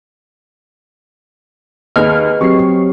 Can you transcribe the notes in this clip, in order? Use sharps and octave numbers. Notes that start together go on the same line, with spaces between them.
D#2 G#4 B4 D#5 F6
F#3 C4 G4 C#6 C7